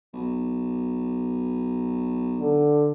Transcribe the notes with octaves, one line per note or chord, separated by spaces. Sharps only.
B1
D3